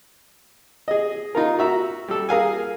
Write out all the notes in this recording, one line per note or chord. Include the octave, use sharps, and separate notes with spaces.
G#4 D#5
D#4 F4 A#4
F#4 E5 A#5
G3 A4
G#4 A#4 F5 G#5